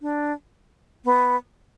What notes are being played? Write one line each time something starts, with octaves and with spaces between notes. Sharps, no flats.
D4
B3